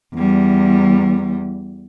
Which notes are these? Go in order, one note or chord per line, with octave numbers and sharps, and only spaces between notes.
E2 G3